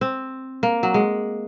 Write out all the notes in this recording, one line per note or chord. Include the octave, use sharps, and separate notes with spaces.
C4
A#3
F#3
G#3